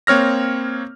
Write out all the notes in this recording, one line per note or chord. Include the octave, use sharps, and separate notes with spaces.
A#3 C4 C#5 F6 A#6